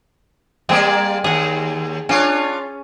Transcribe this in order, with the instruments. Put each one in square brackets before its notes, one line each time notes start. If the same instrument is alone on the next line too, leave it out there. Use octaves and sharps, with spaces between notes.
[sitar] G3 A#3 D5 [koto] C4 G#4
[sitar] D#2 [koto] G#4 F#5
[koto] C#4 [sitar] D4 F4 C#5